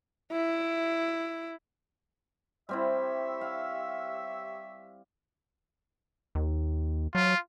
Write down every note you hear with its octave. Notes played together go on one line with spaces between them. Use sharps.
E4
G3 C4 E4 G4 C#5 E5
F5
D#2
F#3 F4